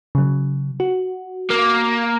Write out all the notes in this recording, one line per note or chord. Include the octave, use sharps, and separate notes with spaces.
C#3 F#3
F#4
A#3